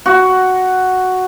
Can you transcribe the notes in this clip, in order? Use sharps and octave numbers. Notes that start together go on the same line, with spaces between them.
F#4